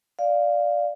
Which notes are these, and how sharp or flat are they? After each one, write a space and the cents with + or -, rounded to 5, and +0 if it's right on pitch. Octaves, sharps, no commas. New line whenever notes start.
D5 +0 F5 +0